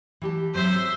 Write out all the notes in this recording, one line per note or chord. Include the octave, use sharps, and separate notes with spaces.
E3 G4 A5
G#2 F#3 C4 C5 E5